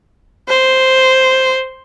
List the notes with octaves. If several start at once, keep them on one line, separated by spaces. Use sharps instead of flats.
C5